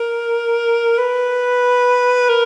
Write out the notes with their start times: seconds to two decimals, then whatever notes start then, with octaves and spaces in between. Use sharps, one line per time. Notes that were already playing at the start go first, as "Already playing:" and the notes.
Already playing: A#4
0.98 B4
2.29 A#4